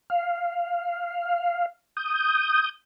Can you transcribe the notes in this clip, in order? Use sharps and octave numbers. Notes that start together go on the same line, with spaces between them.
F5
D#6 G6